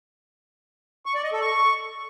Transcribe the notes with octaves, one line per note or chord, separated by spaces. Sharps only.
C#6
D5
D#5
A4
C#6